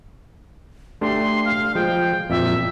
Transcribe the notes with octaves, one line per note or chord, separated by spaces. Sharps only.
A3 D4 G4 C6
F5
F3 G#3 G5
F2 A#2 E5